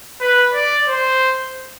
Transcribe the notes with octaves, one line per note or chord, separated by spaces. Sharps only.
B4
D5
C5